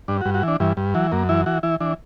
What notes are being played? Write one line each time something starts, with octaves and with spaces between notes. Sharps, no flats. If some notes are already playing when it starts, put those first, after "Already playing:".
G2 D4
F#4
G2
F#4
E3 D4
G2 E3
G2
E3 F#3
F#2 A#3
E3 E4
E3 F#4
E3 E4
E3 D4